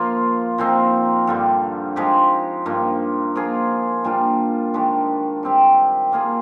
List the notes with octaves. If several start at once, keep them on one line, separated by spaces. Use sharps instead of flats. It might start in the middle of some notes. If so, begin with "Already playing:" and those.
Already playing: F3 A#3 F4
A#2 F3 C4 D#4
G2 D3 G3
F3 G#3 D#4 G4
G2 F3 A#3
F3 A#3 F4 G#4
A#2 G3 D4 F4
D#3 G#3 D4 G4
G3 C4 G4
G3 A#3 F4 G#4